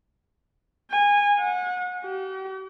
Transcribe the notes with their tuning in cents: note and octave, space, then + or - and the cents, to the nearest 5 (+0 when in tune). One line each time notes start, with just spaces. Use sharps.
G#5 -20
F#5 -30
G4 -45